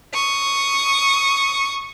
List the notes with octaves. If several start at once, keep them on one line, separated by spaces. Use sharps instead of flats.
C#6 D#6